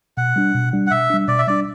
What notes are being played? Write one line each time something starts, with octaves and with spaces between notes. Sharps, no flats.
B2 F#5
G3 D4
B2
G3 D4
F#5
B2 E5
G3 D4
B2 D5
E5
G3 D4 D5